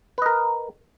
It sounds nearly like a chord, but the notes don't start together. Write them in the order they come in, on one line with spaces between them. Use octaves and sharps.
B4 D#5 A#4